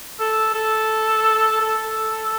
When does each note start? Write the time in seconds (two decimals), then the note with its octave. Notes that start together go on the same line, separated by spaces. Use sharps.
0.20 A4
0.54 A4
1.61 A4